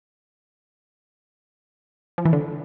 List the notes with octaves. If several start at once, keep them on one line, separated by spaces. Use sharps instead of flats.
F3
E3
D3